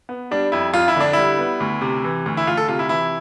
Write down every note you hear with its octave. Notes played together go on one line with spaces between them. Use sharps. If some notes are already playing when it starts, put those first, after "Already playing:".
B3
G3 D4
F2 E4
F2 F4
E4
D3 D4
G3 E4
B3
D2
C3
E3
D2
E4
D2 F4
A4
C3 F4
E4
E3 E4